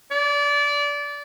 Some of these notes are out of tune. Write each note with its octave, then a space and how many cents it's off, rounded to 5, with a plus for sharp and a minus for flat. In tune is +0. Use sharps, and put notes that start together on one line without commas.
D5 -25